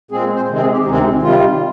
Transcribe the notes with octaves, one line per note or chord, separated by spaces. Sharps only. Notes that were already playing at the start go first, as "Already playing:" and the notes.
A#2 G#3 C4 G#4
C5
C3 D#3 G#3 C4
G#4
G4
D2 C3 D#3 G#3 C4 D#4
D#4
C3 D#3 G3 F4